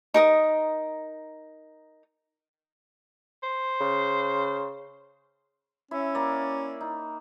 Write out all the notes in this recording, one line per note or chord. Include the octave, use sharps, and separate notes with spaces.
D#4 A#4 D#6
C5
C#3
C#4 E4 E5
A#3 D5
D#4